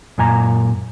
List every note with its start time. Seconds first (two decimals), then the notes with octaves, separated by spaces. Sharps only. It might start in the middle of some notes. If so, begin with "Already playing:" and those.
0.18 F#2 A#2 G#5 A#5